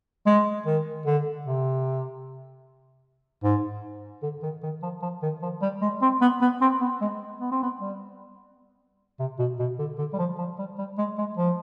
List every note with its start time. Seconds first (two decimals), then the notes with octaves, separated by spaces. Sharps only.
0.26 G#3
0.66 D#3
1.06 D3
1.45 C3
3.43 G#2
4.23 D3
4.43 D#3
4.63 D#3
4.82 F3
5.02 F3
5.23 D#3
5.42 F3
5.62 G3
5.82 G#3
6.02 C4
6.21 B3
6.41 B3
6.61 C4
6.81 B3
7.01 G#3
7.41 B3
7.51 C4
7.63 B3
7.80 G3
9.19 C3
9.39 B2
9.59 B2
9.79 D3
9.98 D3
10.13 G3
10.18 F3
10.38 F3
10.58 G3
10.78 G3
10.98 G#3
11.18 G#3
11.37 F3